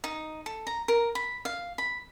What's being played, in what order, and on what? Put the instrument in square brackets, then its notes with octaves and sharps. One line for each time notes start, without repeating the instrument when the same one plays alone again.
[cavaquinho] D#4
A4
A#5
A#4
B5
F5
B5